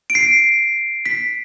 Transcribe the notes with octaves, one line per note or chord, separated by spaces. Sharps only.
D7
C7
B6